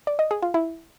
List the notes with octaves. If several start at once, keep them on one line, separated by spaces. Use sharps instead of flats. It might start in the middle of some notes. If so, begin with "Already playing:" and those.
D5
D#5
G#4
F4
E4